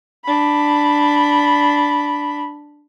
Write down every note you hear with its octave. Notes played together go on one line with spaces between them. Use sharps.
D4 B5